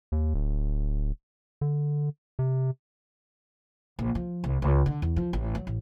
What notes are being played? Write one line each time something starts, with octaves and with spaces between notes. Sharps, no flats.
D#2
D1
D3
C3
A#1
F3
C2
C#2
D3
E2
F3
A1
F#3
A1